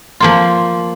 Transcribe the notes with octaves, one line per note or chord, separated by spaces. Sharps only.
F3 A#3 F4